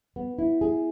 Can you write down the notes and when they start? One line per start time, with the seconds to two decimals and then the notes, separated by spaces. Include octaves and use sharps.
0.16 B3
0.38 E4
0.61 G#4